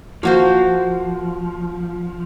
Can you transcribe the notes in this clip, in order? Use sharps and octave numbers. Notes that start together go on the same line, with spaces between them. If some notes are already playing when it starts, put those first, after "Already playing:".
F3 A#3 F#4 C5